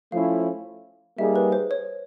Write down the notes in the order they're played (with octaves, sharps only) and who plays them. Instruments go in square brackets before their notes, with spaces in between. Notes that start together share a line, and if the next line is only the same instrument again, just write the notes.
[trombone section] F3 A3 C#4 E4 [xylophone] F5
[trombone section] G3 A#3 D#4 G#4 [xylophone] E5
[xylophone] B4
C5
C#5